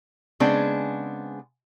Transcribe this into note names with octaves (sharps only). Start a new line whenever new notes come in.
C#3 G#3 B3 C4 D4